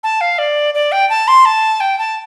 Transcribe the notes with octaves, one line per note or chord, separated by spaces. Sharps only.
A5
F5
D5
D5
G5
A5
C6
A5
G5
A5